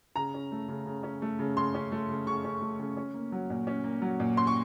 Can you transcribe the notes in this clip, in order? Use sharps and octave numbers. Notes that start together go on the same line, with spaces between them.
C#3 A#5
C#4
A3
C#3
C#3
C#4
A3
C#3
C#3 C6
C#4
A3
C#3
C#3 C#6
C#4
A3
C#3
C#4
A#3
F#3
A#2
C#4
A#3
F#3
A#2
C#4 C6
C#6